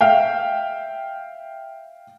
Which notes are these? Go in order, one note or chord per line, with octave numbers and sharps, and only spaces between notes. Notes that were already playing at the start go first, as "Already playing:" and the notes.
E5 F5 G5